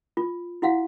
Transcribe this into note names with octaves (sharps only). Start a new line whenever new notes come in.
F4
E4 F#4 F5 F#5